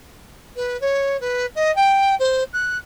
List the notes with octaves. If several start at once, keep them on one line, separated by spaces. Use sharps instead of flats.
B4
C#5
B4
D#5
G5
C5
F#6